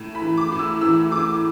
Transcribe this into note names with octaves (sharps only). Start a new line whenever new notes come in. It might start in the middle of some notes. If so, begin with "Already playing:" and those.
Already playing: A2
B5
E3
D6
A2
E6
E3 E6
A2 D6